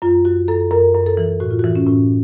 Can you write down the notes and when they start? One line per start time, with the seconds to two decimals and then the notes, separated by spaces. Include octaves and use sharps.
0.02 F#2 F4
0.25 F#2 F#4
0.48 F#2 A4
0.71 F#2 A#4
0.95 F#2
1.06 A4
1.17 E3
1.40 A2 F#4
1.51 F4
1.59 E3 F#4
1.76 C#4
1.87 A2